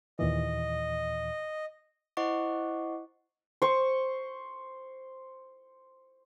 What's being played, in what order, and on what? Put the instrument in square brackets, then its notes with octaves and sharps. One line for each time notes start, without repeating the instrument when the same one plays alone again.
[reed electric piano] D#2 A#2 E3 [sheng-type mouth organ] D#5
[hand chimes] E4 C5 D#5 F#5 C#6 D6
[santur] C5 C#6